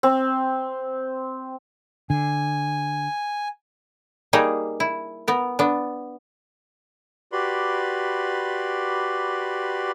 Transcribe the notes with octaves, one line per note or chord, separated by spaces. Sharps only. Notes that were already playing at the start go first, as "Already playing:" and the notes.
C4
D3 G#5
G3 A#3 D#4 G4 G#4
E4
B3 A#4
B3 D4
F#4 G4 B4 D5 B5 C6